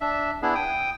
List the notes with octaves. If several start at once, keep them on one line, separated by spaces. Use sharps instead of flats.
D4 E5
B3 D4 E4 G#4
G5 D#6